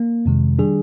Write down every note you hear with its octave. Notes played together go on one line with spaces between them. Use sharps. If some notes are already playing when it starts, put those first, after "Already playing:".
Already playing: A#3
F2 C3 D#3 G#3
D#3 G3 D4 G#4